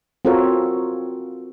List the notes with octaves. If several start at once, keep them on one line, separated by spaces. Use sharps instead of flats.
C4 F4 F#4 A4 A#4 C#5